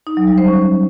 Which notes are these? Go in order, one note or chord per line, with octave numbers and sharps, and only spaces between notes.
D#4
F#3
G3
C5
C#4